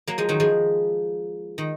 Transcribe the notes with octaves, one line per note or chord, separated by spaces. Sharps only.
F#3 A#3
F3 G#3
D#3 F#3
F3 G#3
D#3